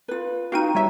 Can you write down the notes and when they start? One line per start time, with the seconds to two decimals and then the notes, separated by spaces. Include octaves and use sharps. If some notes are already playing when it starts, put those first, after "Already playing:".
0.08 F4 B4
0.52 D#4 F#4 F5 G5 D#7
0.75 G3 C#5 E5